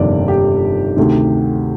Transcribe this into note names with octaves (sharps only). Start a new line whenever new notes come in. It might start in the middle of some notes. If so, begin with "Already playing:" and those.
Already playing: G1 F2 C3 D#3 A#3 D5
G4
D2 C3 D#3